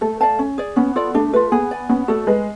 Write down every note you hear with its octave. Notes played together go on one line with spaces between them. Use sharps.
A3 A4
D5 F5 A5
C#4
G#4 D5
B3 C#4
F4 A4 D5
A3 D4
A3 F4 B4
B3 G#4
D5 G#5
B3 C#4
A3 F#4 A4 D5
G#3 B4